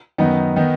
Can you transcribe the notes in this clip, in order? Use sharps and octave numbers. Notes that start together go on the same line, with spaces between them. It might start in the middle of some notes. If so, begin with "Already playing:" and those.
F#2 D#3 B3 D#4
D#3 B3 D#4